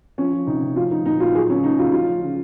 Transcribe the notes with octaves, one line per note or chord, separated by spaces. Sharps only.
F3 C#4
F3
C3 D#4
C3
F3 F4
F3 D#4
A#2 D#4
A#2 F4
F#3 G#4
F#3 C#4
C#3 D#4
C#3 F4
F3 F4
F3
C#3